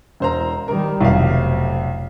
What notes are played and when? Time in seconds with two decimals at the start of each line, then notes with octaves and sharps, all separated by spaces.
0.20 E1 C5 A#5
0.68 D#3 G3 A#4
1.01 F1 B1 C3 E5 F5